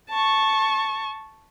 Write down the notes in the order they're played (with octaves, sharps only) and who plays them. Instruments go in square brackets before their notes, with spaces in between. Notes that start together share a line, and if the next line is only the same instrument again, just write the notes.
[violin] A5 C#6